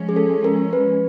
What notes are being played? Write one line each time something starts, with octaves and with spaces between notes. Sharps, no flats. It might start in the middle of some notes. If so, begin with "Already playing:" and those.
Already playing: F3 G#3 C#4
G#4
A4
A#4
B4